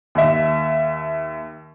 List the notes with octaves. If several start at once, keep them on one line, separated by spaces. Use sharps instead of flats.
D#2 E5